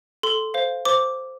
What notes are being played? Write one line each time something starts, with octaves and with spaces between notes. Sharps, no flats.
A4 C6
C5 F5
C5 D6